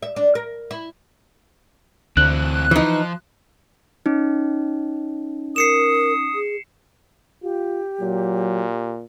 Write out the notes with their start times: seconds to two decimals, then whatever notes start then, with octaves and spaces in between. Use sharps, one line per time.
0.03 E5
0.16 D4
0.35 A#4
0.71 E4
2.17 D2 E3 C4 F#6
2.71 E3 F3 D#4
4.06 C#4 D#4
5.56 A#4 D#6 C7 C#7 E7
6.34 G#4
7.43 F4 G4
8.01 A#2 F#3